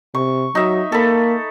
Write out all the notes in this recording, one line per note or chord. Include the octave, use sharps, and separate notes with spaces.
C3 C#6
F#3 D#4 E5
A#3 A4 B5